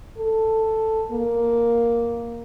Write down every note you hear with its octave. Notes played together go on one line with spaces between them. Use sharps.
A4
A#3